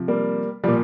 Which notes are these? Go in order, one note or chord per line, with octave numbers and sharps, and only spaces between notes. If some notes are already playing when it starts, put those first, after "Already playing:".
Already playing: C3 F3
G3 A#3
A#2 F3 G3